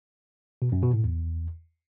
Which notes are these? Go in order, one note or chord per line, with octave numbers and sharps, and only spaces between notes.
B2
F#2
B2
A2
E2